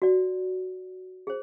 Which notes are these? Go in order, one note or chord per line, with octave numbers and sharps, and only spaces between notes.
F#4 D5
G#4 C5